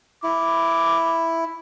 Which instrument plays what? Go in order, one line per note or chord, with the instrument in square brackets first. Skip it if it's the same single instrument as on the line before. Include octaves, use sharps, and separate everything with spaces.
[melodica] E4 [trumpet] D6